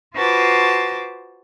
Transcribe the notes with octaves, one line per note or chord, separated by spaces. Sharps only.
F4 F#4 B4 C5 A5 D6